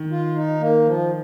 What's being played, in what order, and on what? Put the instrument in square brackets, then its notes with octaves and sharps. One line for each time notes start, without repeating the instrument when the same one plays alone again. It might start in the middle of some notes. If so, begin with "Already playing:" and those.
Already playing: [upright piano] D#3
[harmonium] F4
D#4
A#3
F3